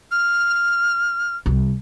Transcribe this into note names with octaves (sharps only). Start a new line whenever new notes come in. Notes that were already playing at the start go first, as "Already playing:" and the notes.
F6
C2